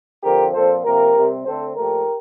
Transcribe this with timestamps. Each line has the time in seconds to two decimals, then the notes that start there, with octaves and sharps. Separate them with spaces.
0.23 D3 F3 C4 G4 A#4
0.53 A#2 F3 C4 A4 C5
0.84 C3 F3 A#3 G4 A#4
1.15 C3 G3 C4
1.45 D3 A3 C4 A4 C5
1.75 A#2 F3 A3 G4 A#4